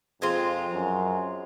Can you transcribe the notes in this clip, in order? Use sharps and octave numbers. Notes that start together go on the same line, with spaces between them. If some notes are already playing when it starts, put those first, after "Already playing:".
F2 G#3 C4 F4
F#2